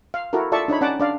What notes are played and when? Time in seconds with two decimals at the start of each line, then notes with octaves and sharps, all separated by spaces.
0.14 F5
0.33 E4 F#4 A4 A#4
0.52 F4 A4 D5 E5 A5 C#6
0.68 D4 D#4 C#5 B5
0.81 C#4 D5 F#5 A5 D6
1.00 D4 D5 F5